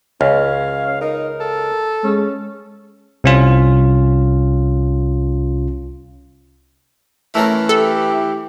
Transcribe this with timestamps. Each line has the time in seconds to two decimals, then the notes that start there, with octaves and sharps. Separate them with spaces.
0.21 C#2 C#4 F5
1.01 D#4 A#4
1.40 A4
2.04 G#3 C#4
3.24 C2 C#4 F4
7.35 E3 A3 C#4 A#4
7.69 G4 A4